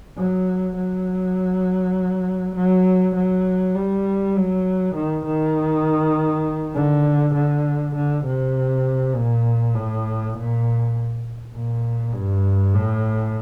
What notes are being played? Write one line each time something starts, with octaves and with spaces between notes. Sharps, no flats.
F#3
F#3
F#3
F#3
G3
F#3
D#3
D#3
D3
D3
D3
C3
A#2
A2
A#2
A#2
G2
A2